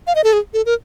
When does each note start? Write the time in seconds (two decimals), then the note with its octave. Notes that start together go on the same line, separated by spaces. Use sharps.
0.07 F5
0.15 D#5
0.24 A4
0.33 G#4
0.54 A4
0.66 A#4